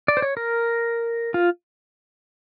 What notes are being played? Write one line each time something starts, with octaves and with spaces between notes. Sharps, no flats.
D5
C5
C#5
A#4
F4